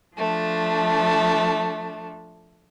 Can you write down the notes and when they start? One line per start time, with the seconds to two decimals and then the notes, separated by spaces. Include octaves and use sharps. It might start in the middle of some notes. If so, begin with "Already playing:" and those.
0.16 F3 A3 D4